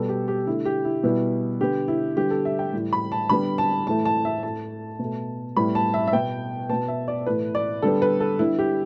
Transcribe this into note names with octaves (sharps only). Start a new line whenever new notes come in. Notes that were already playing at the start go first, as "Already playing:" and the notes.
Already playing: B2 G3 B3 A4
G4
G4
D3 A3 E4
G4
E4
B2 G3 B3 E4
D3 B3 G4
E4
D3 G3 B3 G4
A4
E5
G5
A2 E3 G3
B5
A5
D3 G3 B3 B5
A5
A2 E3 A3 A5
A5
E5
A2 A3 A5
B2 A3
A2 G3 B3 B5
A5
E5
E5
B2 B3 G5
B2 B3 A5
E5
D5
A2 E3 A3 B4
D5
D3 G3 B3 A4
B4
A4
D3 G3 B3 E4
G4